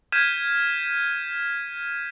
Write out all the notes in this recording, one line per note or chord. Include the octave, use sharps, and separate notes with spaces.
F6 G6 G#6 B6 D#7 E7